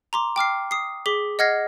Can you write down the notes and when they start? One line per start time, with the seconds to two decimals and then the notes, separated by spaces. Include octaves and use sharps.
0.13 A#5 C6 D6
0.36 G5 D6 F6 C7
0.71 D#6 C7
1.06 G#4 D6 B6 G7
1.39 D#5 F#5 F6 G#6 A#6 C7